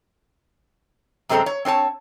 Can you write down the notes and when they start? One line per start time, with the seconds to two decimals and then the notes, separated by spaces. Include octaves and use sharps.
1.29 F#2 C3 G#3 C4 A4 A#5
1.46 C#5
1.65 C4 D4 C#5 A5